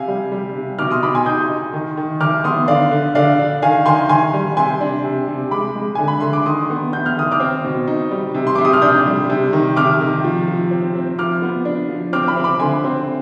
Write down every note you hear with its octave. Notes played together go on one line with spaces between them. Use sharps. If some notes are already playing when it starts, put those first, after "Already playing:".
Already playing: C3 F5 G#5
G3
G3
C3
B2 D6 F6
C6 D#6
B2 B5 D6
G#5 C6
D#4 D#6 G6
D#4
D#3
D#3
D#3 D6 F6
B3 C6 D#6
D3 D5 F5
D3
D3 D5 F5
D4
D#3 F5 G#5
D#3 G#5 C6
D#3 G#5 C6
G3
C3 G#5 C6
D4
C3
C3
G#3 B5 D6
G#3
D3 G#5
B5
D3 C6
D6
D#3 C6 D#6
B3
B3 G6
F6
D#3 D#6
D6 F6
C4
B2
D#4
G3
C3
C6
C3 D6
D#6
F6
D4 D#6 G6
G3
C3
D#3
C3 D6 F6
D#3
F3
F3
C4
C4
F3 D6 F6
B3
D4
F3
C4 D6 F6
B5 D6
C4
B5 D6
D3 G#5 C6
C4